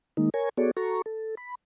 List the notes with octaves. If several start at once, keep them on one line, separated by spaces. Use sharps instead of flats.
D#3 G#3 A#3 D#4
A#4 C#5 G#5
B3 F#4 G#4 A4 C#5 D5
F#4 A4 A#5 C#6
A4
B5